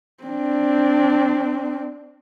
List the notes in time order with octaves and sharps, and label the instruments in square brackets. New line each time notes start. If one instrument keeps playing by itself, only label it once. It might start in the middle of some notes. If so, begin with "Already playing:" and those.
[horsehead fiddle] C4 D4